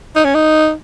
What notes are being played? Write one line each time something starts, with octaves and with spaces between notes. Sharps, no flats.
D#4
C#4
D#4